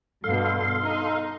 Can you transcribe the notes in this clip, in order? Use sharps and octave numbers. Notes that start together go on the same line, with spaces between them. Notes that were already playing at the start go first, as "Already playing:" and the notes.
G2 B2 A4 F5 C6
D#4